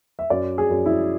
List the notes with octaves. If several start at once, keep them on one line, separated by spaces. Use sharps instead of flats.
E5
F#2 D5
G#4
F#2
E4